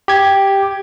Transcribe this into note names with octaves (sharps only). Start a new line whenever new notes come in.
G4 G#6